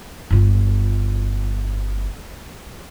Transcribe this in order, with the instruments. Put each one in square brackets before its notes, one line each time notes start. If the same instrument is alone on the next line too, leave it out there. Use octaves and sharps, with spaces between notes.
[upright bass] G1 F4